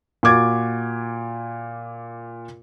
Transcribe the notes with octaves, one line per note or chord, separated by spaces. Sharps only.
A#2 F#4 D6 G#6 A6